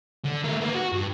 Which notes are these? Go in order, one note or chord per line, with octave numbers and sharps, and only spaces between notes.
D3
A3 A#4
A#3 B3
F#4
G2